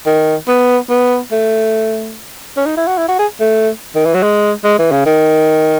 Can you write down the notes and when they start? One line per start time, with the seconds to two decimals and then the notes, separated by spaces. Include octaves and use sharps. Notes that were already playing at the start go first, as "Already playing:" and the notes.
0.06 D#3
0.48 B3
0.90 B3
1.32 A3
2.57 C#4
2.66 D#4
2.77 E4
2.87 F#4
2.97 E4
3.08 F#4
3.19 G#4
3.40 A3
3.95 D#3
4.05 E3
4.14 F#3
4.23 G#3
4.64 G#3
4.79 E3
4.92 C#3
5.06 D#3